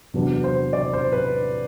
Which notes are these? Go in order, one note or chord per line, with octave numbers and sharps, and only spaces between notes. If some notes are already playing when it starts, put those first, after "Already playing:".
E2 C3 F#3 B3 D4
C5
D5
C5
B4